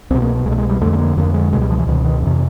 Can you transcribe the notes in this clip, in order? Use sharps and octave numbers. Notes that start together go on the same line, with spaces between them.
C2 B2 C4
A#3
C2 B2 G#3 A3
G#3
G3
F2 D3 A3
A3
A#3
F2 D3 A#3
G#3
C#2 B2 G3 G#3
F3
E3
C#2 B2 D#3
D#3
F2 C3 E3